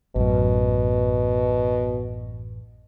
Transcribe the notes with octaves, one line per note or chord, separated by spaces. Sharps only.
A1 F#2 B2